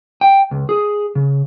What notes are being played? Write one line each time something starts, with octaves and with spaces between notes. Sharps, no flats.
G5
C#2
G#4
C#3